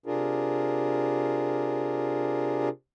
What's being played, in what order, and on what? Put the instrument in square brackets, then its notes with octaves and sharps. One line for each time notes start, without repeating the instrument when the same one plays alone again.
[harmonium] C3 D4 F4 G#4 A#4